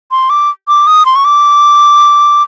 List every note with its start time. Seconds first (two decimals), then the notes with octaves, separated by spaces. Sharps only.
0.11 C6
0.30 D6
0.68 D6
0.87 D#6
1.06 C6
1.16 C#6
1.25 D6